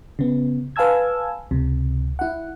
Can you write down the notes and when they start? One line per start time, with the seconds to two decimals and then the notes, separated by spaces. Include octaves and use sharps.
0.19 C#3 B3
0.76 B4 F5 G#5 A5 E6 G#6
1.51 C#2 C3
2.19 E4 F#5